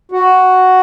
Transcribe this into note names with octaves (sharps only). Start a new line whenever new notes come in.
F#4